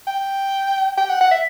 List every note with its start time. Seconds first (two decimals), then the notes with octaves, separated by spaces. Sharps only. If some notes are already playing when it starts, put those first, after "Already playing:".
0.07 G5
0.97 G5
1.09 F#5
1.21 F#5
1.31 E5